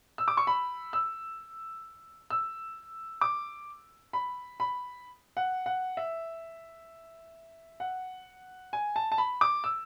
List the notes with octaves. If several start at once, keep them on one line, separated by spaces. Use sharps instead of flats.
E6
D6
C#6
B5
E6
E6
D6
B5
B5
F#5
F#5
E5
F#5
G#5
A5
A5
B5
D6
E6